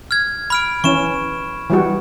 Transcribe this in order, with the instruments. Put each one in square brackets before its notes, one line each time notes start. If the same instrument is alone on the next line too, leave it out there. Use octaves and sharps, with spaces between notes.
[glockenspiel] F6 G#6
B5 F6 D7
[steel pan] E3 C#4 [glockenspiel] C#6 E7
[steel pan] E3 G3 F#4